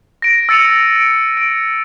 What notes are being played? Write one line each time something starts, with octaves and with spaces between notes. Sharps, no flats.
A#6 D7
E6 A6 C#7 D#7 F7
D7
D7